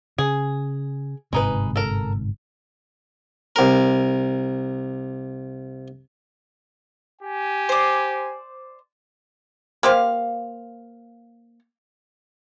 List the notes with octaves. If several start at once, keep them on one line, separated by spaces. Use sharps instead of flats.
C#3 G#4
G1 G#2 C3 G#3 D#4 B4
A4 A#4
C2 A#4
G4 G#5
C5 D5
A#3 G4 C5 F5